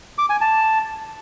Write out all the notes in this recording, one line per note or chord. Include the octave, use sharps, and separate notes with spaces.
D6
G#5
A5